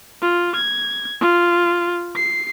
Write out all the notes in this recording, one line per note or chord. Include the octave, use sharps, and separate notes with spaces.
F4
G#6
F4
C7